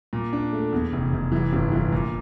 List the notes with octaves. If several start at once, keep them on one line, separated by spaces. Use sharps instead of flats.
A#2
D4
A3
E2
F1
F1
E3
G1
E3
A#2